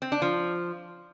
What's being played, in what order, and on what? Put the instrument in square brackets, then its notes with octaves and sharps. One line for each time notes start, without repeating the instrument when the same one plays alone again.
[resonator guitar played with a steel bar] C4
D4
F3